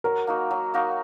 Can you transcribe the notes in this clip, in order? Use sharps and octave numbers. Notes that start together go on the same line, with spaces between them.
F#3 A#4
A#3 D#4 F#4
F#3
A#3 D#4 F#4